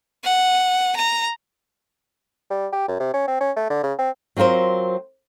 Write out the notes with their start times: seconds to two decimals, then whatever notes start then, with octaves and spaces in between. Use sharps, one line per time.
0.24 F#5
0.96 A#5
2.50 G3
2.72 G4
2.88 F#2
3.00 C3
3.14 C#4
3.28 C4
3.41 C#4
3.56 A3
3.70 D3
3.83 C#3
3.99 C4
4.37 F#3 C4 F4 A#4 C5